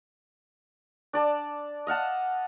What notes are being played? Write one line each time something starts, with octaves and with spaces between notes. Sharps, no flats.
D4 D5 A5
D#5 F5 F#5 A5